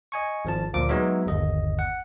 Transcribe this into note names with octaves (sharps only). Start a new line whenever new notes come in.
D#5 G#5 C#6
G#1 F3 A5
D2 A#2 F3 D6
F#3 G#3 B3 D#4 C#5 E5
G1 D#2 D#5
F#5